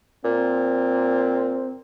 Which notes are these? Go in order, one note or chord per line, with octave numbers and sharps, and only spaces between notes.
A#2 C4